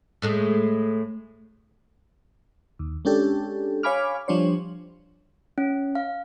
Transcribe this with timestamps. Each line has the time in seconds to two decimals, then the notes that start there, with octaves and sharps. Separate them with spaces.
0.22 A2 G#3 A3
2.79 D#2
3.05 G#3 C#4 D4 G4 A4
3.83 C#5 F5 G#5 B5 D6 F6
4.28 F3 G3 D4 C5 C#5
5.58 C#4
5.95 F5